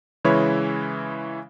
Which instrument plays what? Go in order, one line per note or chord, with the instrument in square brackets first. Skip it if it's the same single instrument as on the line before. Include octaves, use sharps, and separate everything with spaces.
[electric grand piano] C#3 E3 G#3 E4 B4 C#5